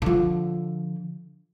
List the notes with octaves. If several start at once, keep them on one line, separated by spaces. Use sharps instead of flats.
D3 F3